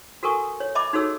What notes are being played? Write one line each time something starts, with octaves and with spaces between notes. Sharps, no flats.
F#4 A4 A#4 G#5 C#6 D#6
C#5
D#5 E5 A5 B5 D6
D#4 F#4 G#4 A4 C#5 E6